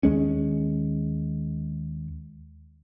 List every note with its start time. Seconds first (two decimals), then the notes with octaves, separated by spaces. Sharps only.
0.03 D#2 G#3 C#4